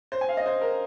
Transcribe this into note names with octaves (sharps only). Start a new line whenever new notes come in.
C5
G#5
F5
D#5
C5
A#4